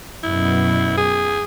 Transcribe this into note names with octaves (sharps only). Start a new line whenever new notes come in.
F#2 B2 E4
G#4